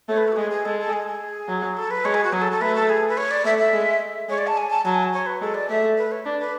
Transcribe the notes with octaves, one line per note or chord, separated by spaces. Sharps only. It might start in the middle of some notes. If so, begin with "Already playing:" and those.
A3 C#5
B4
A4
F#4
G#3 G#4
G#4
G#3 A4
A4
G#4
G#4
F#3
A4
B4
G#3 C#5
G#4
F#4
F#3 G#4
A4
A4
A3 B4
A4
G#4
B4
C#5
D5
A3 E5
E5
G#3
G#3 C#5
D5
A5
G#5
A5
F#3 A5
G#5
C#5
B4
G#3 A4
D5
A3 E5
B4
C#5
D4 B4
B4